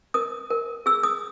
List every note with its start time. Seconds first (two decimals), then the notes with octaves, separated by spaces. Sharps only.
0.14 A#4 D#6
0.50 A#4
0.86 G#4 E6
1.03 D#6